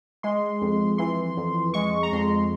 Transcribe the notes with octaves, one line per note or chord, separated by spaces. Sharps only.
G#3 C6
F2
E3 C6
F2
G#3 C#6
A#5
F2 C6